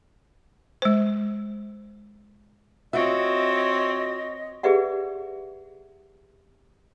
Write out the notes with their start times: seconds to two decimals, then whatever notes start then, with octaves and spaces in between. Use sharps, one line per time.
0.82 G#3 C5
2.93 C4 F4 F#4 C#5 D#5 E5
4.63 G4 G#4 B4 D5 E5 F#5